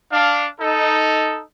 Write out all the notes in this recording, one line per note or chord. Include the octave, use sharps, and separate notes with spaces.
D4 F5
D#4 A4